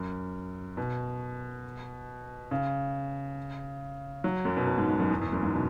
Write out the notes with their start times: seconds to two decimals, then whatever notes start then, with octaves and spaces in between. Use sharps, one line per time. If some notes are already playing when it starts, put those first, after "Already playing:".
Already playing: F#2
0.77 B2
2.51 C#3
4.24 F#3
4.45 F#2
4.57 B2
4.67 B2
4.78 G#2
4.89 G#2
5.00 F#2
5.10 E2
5.21 E2
5.33 F#2
5.43 G#2
5.54 B2